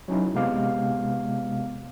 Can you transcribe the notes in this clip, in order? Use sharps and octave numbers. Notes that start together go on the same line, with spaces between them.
F#3 C#4 D#4 E4
C3 G#3 B3 F5 D6